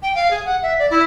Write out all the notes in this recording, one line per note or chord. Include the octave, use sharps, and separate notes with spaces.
G5
F5
G#4
F#5
E5
D5
E4